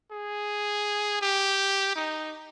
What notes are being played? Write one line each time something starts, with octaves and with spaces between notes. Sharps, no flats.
G#4
G4
D#4